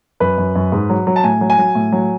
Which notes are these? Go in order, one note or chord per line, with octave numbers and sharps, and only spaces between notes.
F#2 B4
F#2
F#2
G#2
F#3
F#3
A5
A2 G#5
F#3
G#5
F#3
A2
F#3